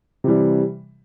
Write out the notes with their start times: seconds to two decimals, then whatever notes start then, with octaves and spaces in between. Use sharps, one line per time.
0.24 C3 E3 G3